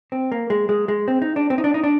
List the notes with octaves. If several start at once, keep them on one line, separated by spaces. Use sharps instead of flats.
C4
A#3
G#3
G#3
G#3
C4
D#4
D4
C4
D#4
D4
D#4
D4